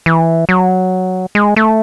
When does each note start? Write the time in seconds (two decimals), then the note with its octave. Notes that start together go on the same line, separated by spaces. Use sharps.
0.06 E3
0.49 F#3
1.35 G#3
1.56 A3